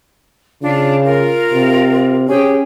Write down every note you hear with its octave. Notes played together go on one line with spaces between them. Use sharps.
C#3 D4 F4
F4 A#4
C3
C#4 G4 G#4 G5